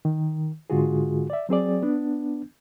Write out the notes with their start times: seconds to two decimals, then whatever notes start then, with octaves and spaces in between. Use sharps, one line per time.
0.05 D#3
0.70 G#2 D3 G#3 F4 F#4 G#4
1.30 D5 E5
1.49 F#3 C4 G#4 D5
1.82 B3 D4